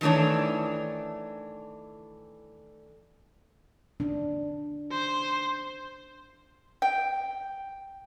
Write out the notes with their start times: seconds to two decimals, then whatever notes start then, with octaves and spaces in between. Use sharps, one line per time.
0.01 D#3 E3 A3 D4 C#5
4.00 D4
4.91 C5
6.82 G5